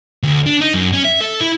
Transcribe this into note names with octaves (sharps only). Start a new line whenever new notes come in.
D2
D4
D#4
F#2
C#4
E5
A4
E4